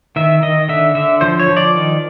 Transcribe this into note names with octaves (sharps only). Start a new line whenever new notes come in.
D#3 E5
D#3 D#5
D3 E5
D3 E5
F3 C5
C#5
F3
D5
D#3